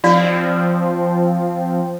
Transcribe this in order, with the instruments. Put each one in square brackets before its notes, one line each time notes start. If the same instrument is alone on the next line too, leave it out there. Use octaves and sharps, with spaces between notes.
[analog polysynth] F3 C4 [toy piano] F4 D5 F5